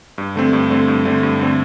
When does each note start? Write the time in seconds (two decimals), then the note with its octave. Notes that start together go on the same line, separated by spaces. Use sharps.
0.18 G2
0.36 D3 A3 C4
0.53 G2
0.70 D3 A3 C4
0.88 G2
1.05 D3 A3 C4
1.23 G2
1.40 D3 A3 C4